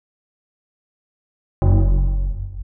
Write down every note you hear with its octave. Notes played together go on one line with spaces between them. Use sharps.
F#1